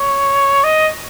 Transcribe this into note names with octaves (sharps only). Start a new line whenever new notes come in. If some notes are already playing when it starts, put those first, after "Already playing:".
Already playing: C#5
D#5